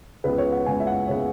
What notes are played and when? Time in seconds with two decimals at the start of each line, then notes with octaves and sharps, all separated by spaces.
0.24 C#2 C#3 G#3 B3 B4
0.38 C#5
0.52 F#5
0.66 C#2 C#3 G#3 B3 G#5
0.80 E5
0.87 F#5
1.08 C#3 G#3 B3 C#5